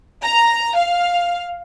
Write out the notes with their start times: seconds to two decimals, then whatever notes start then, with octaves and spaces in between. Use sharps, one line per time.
0.23 A#5
0.77 F5